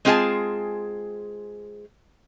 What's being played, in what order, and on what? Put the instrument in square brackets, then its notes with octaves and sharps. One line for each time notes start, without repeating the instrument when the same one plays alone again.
[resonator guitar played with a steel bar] G#3 C4 F4 G#4 G#5 A5